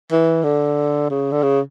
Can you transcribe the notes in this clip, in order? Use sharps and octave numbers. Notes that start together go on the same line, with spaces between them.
E3
D3
C#3
D3
C#3